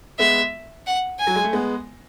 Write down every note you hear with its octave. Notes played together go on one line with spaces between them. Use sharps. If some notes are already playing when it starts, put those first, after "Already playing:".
G#3 B3 E5
F#5
G#5
F#3
G#3
A3
G#3 B3